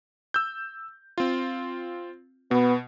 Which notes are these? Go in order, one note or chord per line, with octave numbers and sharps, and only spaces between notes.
E6 G6
C4 F4
B2 B3